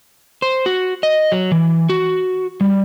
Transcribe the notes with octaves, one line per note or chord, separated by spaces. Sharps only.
C5
F#4
D#5
F#3
E3
F#4
G3